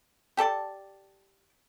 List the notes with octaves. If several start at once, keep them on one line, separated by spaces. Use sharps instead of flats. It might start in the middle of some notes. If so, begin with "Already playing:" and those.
G4 A4 D5 A5